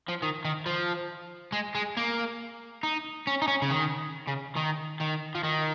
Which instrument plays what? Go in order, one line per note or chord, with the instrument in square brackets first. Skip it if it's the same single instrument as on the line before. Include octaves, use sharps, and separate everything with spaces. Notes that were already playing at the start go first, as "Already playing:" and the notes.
[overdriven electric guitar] F3
D#3
D#3
F3
G#3
G#3
A#3
D#4
C#4
D#4
C#4
C#3
D#3
C#3
D#3
D#3
F3
D#3